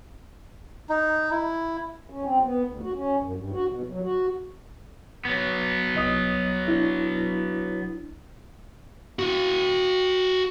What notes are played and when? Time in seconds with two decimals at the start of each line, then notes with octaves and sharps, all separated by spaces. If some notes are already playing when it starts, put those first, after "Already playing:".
0.89 D#4
1.31 E4
2.10 C#4
2.23 C4
2.44 B3
2.63 D2
2.82 F#4
2.94 C#4
3.20 F#2
3.36 G2
3.52 F#4
3.69 B2
3.90 F#3
4.02 F#4
5.25 F#3 B3
5.95 C2 D#5 D#6
6.68 D4 E4
9.19 F#4 F5